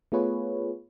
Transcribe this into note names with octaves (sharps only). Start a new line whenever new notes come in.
A3 B3 F4 G#4 B4 C#5